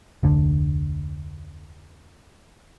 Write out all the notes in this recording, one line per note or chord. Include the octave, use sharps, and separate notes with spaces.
F1 D2 D3